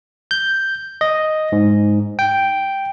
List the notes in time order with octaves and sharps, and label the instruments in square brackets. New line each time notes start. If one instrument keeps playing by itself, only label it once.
[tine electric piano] G6
D#5
G#2
G5